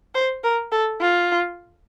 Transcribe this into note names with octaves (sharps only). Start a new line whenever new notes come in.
C5
A#4
A4
F4